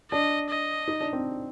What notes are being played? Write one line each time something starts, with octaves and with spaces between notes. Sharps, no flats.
D4 D#5
D#5
D#4
D4
C4